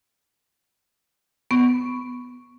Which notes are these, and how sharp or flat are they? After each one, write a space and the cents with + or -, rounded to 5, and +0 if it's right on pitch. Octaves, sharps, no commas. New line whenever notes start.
B3 +5 C#6 +0